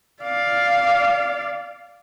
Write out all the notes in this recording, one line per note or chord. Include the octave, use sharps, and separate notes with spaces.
D5 F5